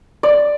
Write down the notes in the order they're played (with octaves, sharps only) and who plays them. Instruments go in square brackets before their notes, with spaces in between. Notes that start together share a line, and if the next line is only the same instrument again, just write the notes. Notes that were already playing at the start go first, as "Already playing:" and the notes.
[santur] D5